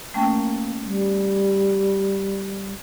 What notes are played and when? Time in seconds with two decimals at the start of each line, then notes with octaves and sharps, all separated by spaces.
0.14 A3 A#3 C#4 G5
0.84 G3